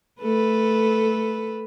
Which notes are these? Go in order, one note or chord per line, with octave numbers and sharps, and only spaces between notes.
A3 A4 B4